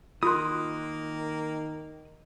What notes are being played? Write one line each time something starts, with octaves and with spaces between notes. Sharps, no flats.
D#3 A#3 F4 F#4 C6 D#6 F#6